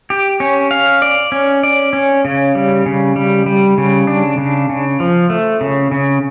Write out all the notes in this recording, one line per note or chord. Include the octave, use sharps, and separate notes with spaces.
G4
C#4
F5
D5
C#4
D5
C#4
C#3
G3
C#3
G3
G3
C#3
D4
C#3
C#3
F3
A3
C#3
C#3